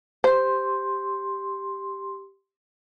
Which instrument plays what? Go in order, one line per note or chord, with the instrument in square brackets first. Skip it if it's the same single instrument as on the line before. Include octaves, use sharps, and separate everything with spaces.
[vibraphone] G4 C6 [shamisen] C5